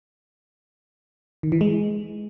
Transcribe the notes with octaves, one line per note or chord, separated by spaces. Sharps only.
D#3
E3
G#3